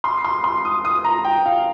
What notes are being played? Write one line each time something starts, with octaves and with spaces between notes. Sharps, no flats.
C6
C6
C6
D#6
D#6
A#5
G5
F5